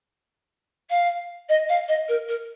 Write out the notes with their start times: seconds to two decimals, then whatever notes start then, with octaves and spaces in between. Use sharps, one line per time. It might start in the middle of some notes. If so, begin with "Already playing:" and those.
0.90 F5
1.49 D#5
1.68 F5
1.88 D#5
2.08 A#4
2.28 A#4